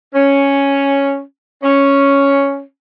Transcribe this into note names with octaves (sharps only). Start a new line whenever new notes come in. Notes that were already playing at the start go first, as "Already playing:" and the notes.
C#4
C#4